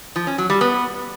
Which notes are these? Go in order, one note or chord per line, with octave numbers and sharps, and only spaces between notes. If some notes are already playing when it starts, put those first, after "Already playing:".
F3
C#4
F#3
G3
B3